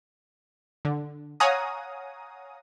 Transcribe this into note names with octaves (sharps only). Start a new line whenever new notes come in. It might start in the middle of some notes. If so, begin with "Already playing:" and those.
D3
C#5 F5 F#5 G#5 A#5 D#6